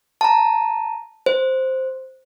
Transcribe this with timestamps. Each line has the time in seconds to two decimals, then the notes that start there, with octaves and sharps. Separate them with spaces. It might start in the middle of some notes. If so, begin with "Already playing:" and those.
0.21 A5 A#5
1.26 C5